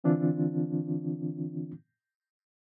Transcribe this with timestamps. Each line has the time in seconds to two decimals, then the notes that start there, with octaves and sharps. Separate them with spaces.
0.04 D3 E3 C4 D4 F4